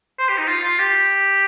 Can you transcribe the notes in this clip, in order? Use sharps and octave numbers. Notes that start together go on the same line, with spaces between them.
C5
G4
D#4
F4
F4
G4